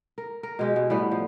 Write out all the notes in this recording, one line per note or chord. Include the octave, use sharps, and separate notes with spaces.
A#4
A#4
B2 G#3 G4
B2
A2 G3 B3
F3